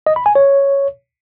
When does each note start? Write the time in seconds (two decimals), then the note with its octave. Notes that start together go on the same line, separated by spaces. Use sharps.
0.07 D#5
0.16 B5
0.26 G#5
0.35 C#5